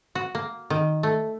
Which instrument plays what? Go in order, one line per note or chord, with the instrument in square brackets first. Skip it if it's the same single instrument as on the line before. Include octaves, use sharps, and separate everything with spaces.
[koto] F#4
A#3
D#3
A3